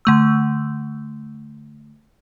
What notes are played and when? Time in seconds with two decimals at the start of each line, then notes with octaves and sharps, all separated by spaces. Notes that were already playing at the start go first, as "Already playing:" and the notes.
0.05 D3 A3 E6